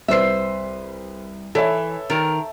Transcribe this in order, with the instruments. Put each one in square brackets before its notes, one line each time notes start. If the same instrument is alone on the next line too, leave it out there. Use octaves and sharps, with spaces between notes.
[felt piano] C2 B4 C7 [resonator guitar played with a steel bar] C5 E5
[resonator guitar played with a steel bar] E3 [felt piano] A4 C#5 E5
[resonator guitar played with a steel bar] D#3 A#4